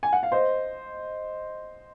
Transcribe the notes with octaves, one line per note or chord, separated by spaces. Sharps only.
G#5
F#5
F5
C5 D#5